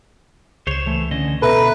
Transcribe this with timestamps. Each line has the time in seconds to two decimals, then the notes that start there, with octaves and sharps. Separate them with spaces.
0.67 C#2 C5 C#5 E7
0.86 E3 A3
1.11 D3 C#4 D#5
1.42 B2 A4 B4 E5 A#5